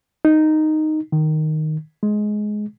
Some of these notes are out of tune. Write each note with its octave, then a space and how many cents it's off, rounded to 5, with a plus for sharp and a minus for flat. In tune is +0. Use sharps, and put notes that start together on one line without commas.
D#4 -5
D#3 -5
G#3 +15